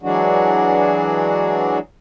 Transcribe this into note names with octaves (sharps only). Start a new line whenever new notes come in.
E3 F#3 G#3 D4 F#4